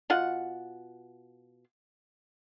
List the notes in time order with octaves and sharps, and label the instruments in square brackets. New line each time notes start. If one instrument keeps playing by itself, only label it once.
[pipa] B2 F4 F#5